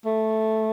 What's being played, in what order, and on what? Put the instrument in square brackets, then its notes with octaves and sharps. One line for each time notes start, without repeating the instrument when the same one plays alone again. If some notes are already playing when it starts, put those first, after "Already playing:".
[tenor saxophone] A3